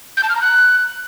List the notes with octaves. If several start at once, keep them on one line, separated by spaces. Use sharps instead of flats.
G6
A5
F6
A#5
F#6